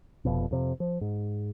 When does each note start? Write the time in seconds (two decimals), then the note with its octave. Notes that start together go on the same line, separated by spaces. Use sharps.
0.25 F1 F2 B2
0.51 F2 C3
0.80 F3
1.01 G#2